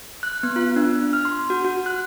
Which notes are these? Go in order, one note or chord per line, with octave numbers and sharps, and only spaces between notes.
F#6
B3
F4
D4
F6
C6
F#4
F#4
F#6